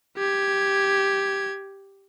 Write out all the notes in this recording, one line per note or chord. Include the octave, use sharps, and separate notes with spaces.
G4 G#6